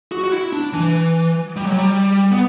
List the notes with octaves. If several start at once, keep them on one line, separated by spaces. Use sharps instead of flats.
F#4
F#4
E4
D4
E3
G3
F#3
G3
B3